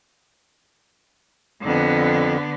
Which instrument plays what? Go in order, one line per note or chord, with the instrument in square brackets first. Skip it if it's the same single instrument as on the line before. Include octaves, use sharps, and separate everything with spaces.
[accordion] F2 [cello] D3 B3